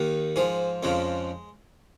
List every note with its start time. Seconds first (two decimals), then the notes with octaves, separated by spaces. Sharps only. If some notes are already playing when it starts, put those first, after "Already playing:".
Already playing: D#2 D#3
0.36 G#2 F3 G#4
0.83 F2 C#3 F3 G#3